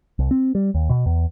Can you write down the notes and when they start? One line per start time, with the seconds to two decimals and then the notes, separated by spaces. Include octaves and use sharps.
0.19 C2
0.31 C4
0.55 G3
0.74 D#2
0.89 B2
1.06 E2